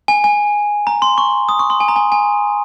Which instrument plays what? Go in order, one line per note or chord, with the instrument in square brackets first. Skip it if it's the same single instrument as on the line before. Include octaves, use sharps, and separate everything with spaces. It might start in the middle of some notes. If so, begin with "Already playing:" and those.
[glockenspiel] G#5
G#5
A#5
C6
C#6
D#6
C#6
C6
G#5
A#5
G#5
G#5